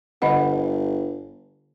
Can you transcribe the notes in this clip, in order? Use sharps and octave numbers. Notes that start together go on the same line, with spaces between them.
G1 D3 D#5 F#5